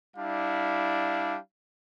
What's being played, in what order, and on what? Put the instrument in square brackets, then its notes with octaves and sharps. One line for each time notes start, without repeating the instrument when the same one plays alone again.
[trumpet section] G3 D4 E4 F5